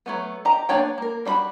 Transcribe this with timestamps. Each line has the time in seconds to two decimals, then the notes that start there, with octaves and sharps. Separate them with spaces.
0.06 F#3 A3 B3
0.45 G4 D#5 A#5
0.69 A#3 B3 D4 C#5 G5
0.98 A#3 A#4
1.25 G3 D4 F#4 B5